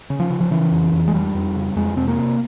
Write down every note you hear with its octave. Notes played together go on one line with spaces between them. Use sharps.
C#3
F3
C#3
F3
C#3 E3
F2
F2
G#3
F2 G3
F2
C#3
F2 G#3
C3 C4
A#3
C3